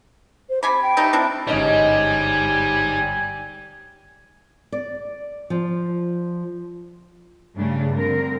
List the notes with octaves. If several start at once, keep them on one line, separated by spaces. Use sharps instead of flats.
C5
C3 G#5 B5 D6
G5
G3 A3 D#4
C4 D4 E4
G1 G#2 G3 C#4 D#4 D#5 G#5
D5
F3
G2 C#3 G3 A3 D4
D3 C4 A#4